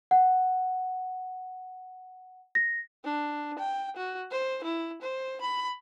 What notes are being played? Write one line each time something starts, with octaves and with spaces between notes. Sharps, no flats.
F#5
A#6
D4
G5
F#4
C5
E4
C5
B5